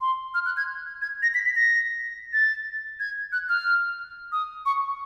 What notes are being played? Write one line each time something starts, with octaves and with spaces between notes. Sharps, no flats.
C6
F6
F#6
G#6
G#6
A#6
B6
B6
A#6
A6
G#6
F#6
F6
D#6
C#6